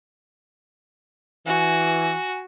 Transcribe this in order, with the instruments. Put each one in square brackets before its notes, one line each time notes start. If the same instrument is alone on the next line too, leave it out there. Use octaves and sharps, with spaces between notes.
[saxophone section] E3 [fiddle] F#4 [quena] G#5